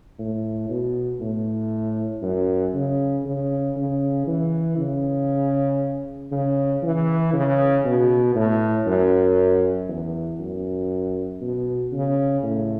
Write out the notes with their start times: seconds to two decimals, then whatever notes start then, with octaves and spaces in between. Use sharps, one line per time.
0.19 A2
0.69 B2
1.20 A2
2.22 F#2
2.74 C#3
3.25 C#3
3.76 C#3
4.27 E3
4.78 C#3
6.31 C#3
6.83 E3
7.33 C#3
7.84 B2
8.35 A2
8.86 F#2
9.89 E2
10.39 F#2
11.41 B2
11.92 C#3
12.43 A2